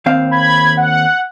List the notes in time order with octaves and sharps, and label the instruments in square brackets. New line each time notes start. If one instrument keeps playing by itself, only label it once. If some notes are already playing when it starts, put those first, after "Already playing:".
[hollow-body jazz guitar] D#2 C4 F5
[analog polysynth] B5 G#6
F#5